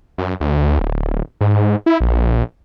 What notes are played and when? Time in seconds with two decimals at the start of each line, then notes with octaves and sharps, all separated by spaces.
0.18 F#2
0.40 D2
0.79 D1
1.41 G#2
1.86 E4
2.00 A#1